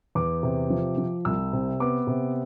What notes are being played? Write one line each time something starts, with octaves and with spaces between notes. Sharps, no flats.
E2 D6
C3
F3
F3
C2 E6
C3
B3 D6
C3